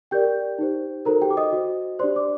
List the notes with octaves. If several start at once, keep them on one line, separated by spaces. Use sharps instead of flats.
G4 A#4 D5 G5 G6
D#4 G4 C5
D#4 F#4 A4 A#4 C5 A#5
G4 G5
D6
D#5 D#6
F#4 C5
D4 G4 C5 D5 C6
D5 D6